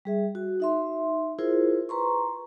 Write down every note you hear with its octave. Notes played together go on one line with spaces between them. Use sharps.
G3 G#4 E5
F#4
D#4 E5 C6
E4 F4 G#4 A#4 C5
B4 A#5 C6 C#6